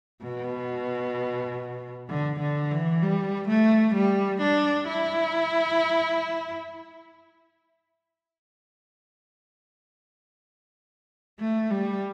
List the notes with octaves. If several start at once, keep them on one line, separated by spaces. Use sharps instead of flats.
B2
D3
D3
E3
G3
A3
G3
D4
E4
A3
G3